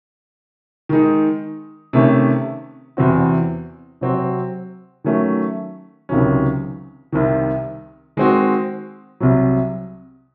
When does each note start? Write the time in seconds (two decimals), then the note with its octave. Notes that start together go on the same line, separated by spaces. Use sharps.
0.89 D#3 G#3 D#4
1.93 C3 D#3 A3 C#4
2.97 E2 C3 E3 C4 F#4
4.01 C3 F#3 C4 F#4
5.04 D#3 F#3 A3 C#4
6.09 C#2 C3 D#3 F#3 C#4
7.12 C2 C3 D#3
8.17 D#3 G#3 C4 F#4
9.20 C2 C3 F#3